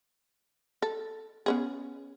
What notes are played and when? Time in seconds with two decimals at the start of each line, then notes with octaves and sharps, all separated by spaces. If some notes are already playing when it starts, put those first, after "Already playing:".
0.82 A4
1.46 B3 C#4 G#4